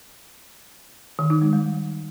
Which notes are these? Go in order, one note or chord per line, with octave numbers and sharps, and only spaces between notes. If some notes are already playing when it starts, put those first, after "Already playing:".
D#3
D#4
G#3
G3